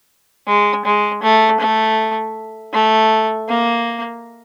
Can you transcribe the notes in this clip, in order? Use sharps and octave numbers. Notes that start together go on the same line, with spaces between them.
G#3
G#3
A3
A3
A3
A#3